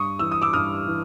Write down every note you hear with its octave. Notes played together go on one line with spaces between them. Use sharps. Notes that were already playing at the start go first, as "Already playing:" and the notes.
Already playing: G2 C#6 D#6
E3 E6
D#6
D6 E6
G2 D#6 F6
E3